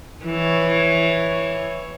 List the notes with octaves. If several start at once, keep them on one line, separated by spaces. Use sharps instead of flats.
E3 C#5